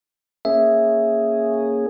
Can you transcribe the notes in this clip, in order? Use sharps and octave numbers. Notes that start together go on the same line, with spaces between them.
A#3 C#4 G#4 E5